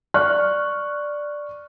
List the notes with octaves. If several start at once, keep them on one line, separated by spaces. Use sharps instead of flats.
D5 C#6 F6 F#6